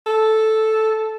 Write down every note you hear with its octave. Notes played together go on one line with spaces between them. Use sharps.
A4